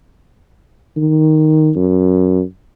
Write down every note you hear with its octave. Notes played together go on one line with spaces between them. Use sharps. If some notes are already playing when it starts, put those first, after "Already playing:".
D#3
F#2